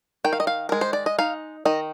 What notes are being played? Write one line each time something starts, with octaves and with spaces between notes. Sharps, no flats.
D#3 G5
F5
D#5
F5
G#3 A#4
C5
D5
D#5
D#4 F5
D#3 D#5